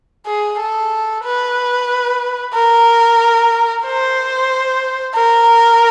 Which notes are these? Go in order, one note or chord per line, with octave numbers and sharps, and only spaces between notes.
G#4
A4
B4
A#4
C5
A#4